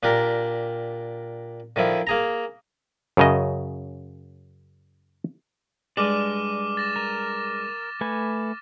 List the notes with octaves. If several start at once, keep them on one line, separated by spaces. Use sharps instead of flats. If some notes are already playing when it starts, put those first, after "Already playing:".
A#2 D4 G4 A#4
D3 D#3 F3 E4
A#3 G#4 A#5
F#2 C#3 D#5
G2 G#3 D5 D6 F6 D#7
A6 A#6 E7
A#4
A3 B4 G#5